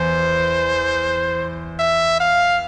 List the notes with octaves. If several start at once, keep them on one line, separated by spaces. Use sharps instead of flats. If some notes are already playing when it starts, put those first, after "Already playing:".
Already playing: E2 C5
E5
F5